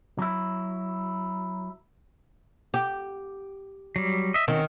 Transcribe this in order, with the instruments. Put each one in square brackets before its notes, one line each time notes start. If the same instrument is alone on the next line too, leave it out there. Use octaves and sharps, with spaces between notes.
[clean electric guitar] F#3 E4
[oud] G4
[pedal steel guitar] F#3 G3
D#5 E5
[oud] D#3 [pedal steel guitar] C4 C#4 F#4